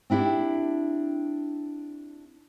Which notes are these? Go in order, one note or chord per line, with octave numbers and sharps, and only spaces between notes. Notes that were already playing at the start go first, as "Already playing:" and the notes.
C4 D4 E4 G4 E5